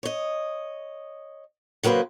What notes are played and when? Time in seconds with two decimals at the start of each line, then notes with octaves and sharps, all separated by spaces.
0.03 C#5 D#5
1.83 C#3 F#3 A#3 B4 C5